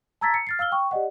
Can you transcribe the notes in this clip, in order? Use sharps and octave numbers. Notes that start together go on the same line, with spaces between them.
A5 A#5 E6 G#6 A6 B6
C#7
F6 A6 C7
F5 E6 F6 G7
G5 C#6
G4 D5 D#5 F#5